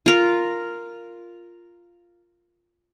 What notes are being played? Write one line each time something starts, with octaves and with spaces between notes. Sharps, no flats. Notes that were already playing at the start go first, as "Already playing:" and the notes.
F4 A#4